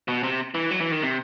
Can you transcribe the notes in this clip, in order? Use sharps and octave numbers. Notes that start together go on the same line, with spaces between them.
B2
C3
E3
F#3
E3
D#3
C3